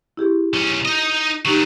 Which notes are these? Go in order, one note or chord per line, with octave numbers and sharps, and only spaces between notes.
E4 G4 G#4
B1 C#4
D#4 D#5
D#3 F#3 D#4 G4 C#6